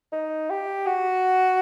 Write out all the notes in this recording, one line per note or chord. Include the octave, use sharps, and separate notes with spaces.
D#4
G4
F#4